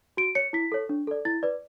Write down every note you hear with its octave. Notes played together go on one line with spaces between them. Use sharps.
F#4 D7
C#5 C#7
E4 B6
A4 C#5
D4
A4 D5
E4 A6
B4 D5